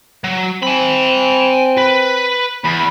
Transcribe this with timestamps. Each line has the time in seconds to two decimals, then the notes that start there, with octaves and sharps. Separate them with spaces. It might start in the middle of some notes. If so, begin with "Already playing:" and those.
0.24 F#3
0.63 C4 G#5 B5
1.78 B4
2.64 E2 B5